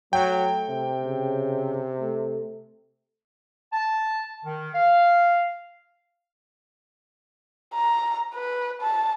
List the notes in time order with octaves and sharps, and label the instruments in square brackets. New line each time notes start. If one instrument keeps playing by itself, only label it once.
[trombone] F#3 [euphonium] A3 [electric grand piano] G5
[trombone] C3
[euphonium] C#3
A3
[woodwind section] A5
D#3
F5
[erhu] A#5
B4
A5